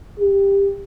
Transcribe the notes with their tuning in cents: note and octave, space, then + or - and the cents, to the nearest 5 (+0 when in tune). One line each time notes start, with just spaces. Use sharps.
G4 +15